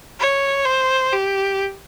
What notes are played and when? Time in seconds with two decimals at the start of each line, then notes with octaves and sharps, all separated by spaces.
0.20 C#5
0.66 C5
1.13 G4